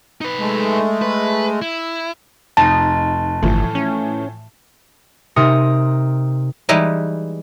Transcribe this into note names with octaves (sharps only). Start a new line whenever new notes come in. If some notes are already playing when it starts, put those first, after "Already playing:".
D#4 B4
G#3 A3
B4
E4
F1 D#4 A5
G1 A2 E3 F3
C#4
C3 D#4 A#4 C6 D#6 C#7
E3 G3 G#3 D#4 E4 B4